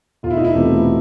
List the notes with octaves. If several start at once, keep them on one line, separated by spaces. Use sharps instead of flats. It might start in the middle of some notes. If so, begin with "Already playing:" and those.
E1 F4
E4
D#4
E4
E2 C3 E3 A3